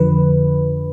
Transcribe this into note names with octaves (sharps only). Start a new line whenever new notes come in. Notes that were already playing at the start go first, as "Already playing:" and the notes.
Already playing: F2 D3 F3 B4